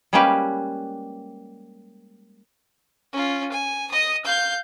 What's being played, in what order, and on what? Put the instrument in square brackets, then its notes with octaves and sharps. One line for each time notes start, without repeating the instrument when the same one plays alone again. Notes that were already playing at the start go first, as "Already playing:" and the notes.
[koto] G3 G#3 A#3 C#4 G4 B4
[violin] C#4 F4
G#5
D#5 D#6
F5 G6